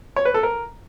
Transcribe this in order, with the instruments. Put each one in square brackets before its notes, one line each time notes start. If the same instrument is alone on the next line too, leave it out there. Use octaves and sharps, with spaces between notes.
[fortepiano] C#5
B4
A4
A#4